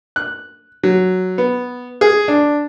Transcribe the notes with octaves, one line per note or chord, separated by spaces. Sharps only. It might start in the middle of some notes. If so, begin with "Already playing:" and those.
F#6
F#3
B3
G#4
D4